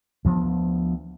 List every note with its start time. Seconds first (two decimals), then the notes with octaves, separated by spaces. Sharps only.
0.25 D2 F3 B3